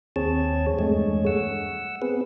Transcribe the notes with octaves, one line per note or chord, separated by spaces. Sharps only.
D#2 C4 G#4 C#5 A5
E2 G2 G#3 A3 G#4 C#5
F#5 E6
B3 C4 G#4 B4